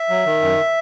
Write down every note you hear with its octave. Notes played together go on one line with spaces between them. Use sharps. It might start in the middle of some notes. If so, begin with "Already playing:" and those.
Already playing: E5
F#3
D#3
F#2